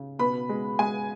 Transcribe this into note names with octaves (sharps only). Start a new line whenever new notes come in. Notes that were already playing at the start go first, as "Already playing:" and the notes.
Already playing: C#3
B2 B4 B5
G#3
G#3 G#5